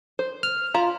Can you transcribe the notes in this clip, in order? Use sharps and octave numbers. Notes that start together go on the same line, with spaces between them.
C5
F6
F4 A#5